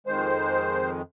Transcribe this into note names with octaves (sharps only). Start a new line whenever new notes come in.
F2 D#3 G#3 C5